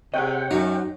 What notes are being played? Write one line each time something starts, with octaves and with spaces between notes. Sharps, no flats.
C3 G#4 C#5 D#5 F#5 G5
F#2 F#3 D#4